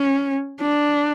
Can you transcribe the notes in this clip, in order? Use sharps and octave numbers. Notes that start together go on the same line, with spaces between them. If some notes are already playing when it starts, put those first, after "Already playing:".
Already playing: C#4
D4